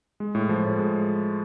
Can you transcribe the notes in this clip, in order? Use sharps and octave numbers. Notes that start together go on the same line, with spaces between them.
G#3
A2
F3
A2
G#3